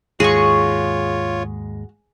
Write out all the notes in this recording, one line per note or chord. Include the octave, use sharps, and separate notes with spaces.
D#2 G#2 G#3 F4 F#4 G#4 C#5 C#6